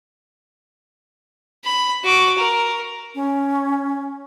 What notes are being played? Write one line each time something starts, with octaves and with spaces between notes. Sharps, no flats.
B5
F#4 D6
A#4
C#4